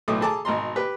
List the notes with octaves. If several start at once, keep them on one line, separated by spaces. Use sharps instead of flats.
B1 A2 A3 D6 D#6
G#4 A4 A5 A#5 D6
G#1 B2 A#5 C6
G4 B4